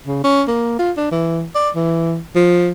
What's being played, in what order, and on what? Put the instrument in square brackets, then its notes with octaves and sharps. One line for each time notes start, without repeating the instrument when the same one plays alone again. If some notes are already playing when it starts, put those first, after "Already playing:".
[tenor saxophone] C#3
C#4
A#3
F4
D4
E3
D5
E3
F3